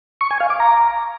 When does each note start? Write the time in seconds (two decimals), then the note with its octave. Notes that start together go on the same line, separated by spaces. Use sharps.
0.21 C#6
0.31 G#5
0.40 F5
0.50 D6
0.60 A#5